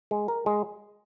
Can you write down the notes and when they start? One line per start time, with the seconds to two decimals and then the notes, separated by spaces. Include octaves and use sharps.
0.11 G#3
0.28 A#4
0.46 G#3